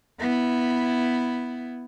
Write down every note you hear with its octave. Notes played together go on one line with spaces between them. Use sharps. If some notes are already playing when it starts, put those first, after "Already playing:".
B3 E4